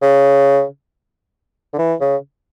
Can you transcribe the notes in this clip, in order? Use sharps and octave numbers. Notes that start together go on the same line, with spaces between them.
C#3
D3
E3
C#3